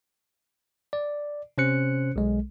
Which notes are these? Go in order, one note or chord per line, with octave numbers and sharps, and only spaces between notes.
D5
C3 C#4 C5 F#6 C#7
B1 G#3